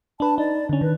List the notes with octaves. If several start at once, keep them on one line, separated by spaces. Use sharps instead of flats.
D4 B4 A5
D#4 D5
D3 C#4
D#3 B4